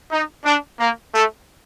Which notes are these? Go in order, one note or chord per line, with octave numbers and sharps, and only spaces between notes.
D#4
D4
A#3
A3